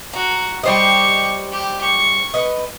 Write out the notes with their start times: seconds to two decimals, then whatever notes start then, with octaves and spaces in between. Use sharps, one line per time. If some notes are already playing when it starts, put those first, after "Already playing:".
0.14 F#4 A#5
0.63 G3 G4 C5 D#5 C#6
1.52 G4
1.82 C#6
2.34 B4 D#5